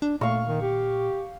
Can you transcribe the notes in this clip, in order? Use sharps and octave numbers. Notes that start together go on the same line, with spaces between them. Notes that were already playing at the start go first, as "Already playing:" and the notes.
D4
A#2 A3 F5 C#6
D#3
G4